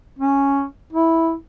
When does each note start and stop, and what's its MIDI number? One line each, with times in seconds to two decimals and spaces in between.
0.19 0.65 61
0.93 1.33 64